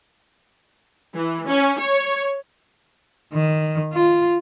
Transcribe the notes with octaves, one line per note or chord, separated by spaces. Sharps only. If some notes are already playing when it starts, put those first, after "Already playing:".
E3
C#4
C#5
D#3
F4